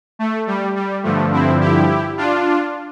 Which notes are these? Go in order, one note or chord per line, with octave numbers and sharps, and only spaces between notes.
A3
G3
G3
G2 D3 F3 A3
C4 E4
E4 G4
D4 F4